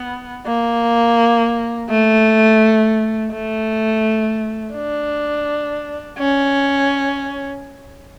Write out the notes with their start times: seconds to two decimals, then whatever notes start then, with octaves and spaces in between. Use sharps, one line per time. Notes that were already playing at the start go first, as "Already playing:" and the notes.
Already playing: B3
0.47 A#3
1.89 A3
3.32 A3
4.74 D4
6.18 C#4